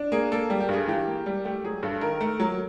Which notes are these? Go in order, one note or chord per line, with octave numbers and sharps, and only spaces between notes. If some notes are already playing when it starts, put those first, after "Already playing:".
Already playing: D4
A#3 G#4
A#3 A4
G3
G4
G2 G#4
E3 G4
A#3
G3
A3 G4
F#3 G#4
G2 A4
D#3 A#4
A3
F#3